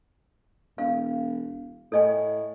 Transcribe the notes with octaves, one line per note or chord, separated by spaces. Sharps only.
E1 F5
A2 A4 D#5 G#5